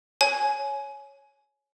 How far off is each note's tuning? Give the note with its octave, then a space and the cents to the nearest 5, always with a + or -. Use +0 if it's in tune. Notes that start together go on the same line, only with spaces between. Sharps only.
C#5 +0 G#5 +20